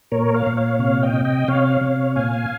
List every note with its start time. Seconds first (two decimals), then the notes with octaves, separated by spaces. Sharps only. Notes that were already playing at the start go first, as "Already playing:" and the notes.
0.12 A#2 A#4 C#5
0.34 C#5 F5
0.46 A#2
0.57 C#5 F5
0.79 C3 C#5 F5
1.03 D#5 G5
1.14 C3
1.25 D#5 G5
1.48 C3 C#5 F5
1.81 C3
2.16 A#2 F5 G#5